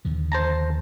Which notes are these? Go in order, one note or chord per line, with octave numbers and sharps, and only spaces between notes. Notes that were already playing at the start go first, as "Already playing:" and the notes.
D#2 D3 F3
C5 A5 A#5